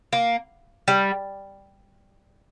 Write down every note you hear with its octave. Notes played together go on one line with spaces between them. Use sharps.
A#3
G3